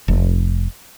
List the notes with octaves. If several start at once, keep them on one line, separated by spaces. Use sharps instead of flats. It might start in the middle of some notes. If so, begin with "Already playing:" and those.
F1